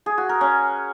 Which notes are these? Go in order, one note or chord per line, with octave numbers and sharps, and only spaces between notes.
G#4
F#4
A#4
C#4